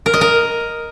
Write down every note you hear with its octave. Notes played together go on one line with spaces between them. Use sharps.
A#4
D#5
A#4